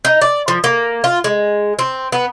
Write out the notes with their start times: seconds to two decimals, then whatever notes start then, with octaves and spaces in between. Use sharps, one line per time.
0.05 D#4
0.22 D5
0.48 F3
0.64 A#3
1.04 F4
1.24 G#3
1.79 C4
2.12 B3